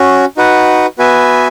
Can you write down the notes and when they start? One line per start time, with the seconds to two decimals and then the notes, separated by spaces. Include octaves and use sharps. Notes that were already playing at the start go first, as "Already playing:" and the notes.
Already playing: C#4 F#4
0.37 D#4 F#4 B4 F#5
0.98 B3 F#4 B4 E5 G#5